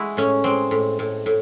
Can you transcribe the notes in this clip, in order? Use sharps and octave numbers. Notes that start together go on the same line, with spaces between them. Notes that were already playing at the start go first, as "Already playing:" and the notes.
Already playing: G#3 E4 F#4
A2 C#4
G#3 C4
A2
A2
A2